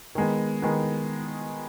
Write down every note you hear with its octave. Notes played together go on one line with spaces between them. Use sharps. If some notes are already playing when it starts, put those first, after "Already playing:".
D#3 G#3 B3
D#3 G#3 B3